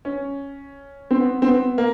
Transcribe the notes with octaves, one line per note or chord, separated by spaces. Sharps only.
C#4
C4
B3
C4
B3
A#3